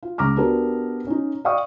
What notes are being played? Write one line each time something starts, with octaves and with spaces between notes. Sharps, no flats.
F4
C#2 A#5 D6 F6
B3 D4 F#4 G4 A#4 B4
C#4 D#4
D5 D#5 F5 G5 C#6 D#6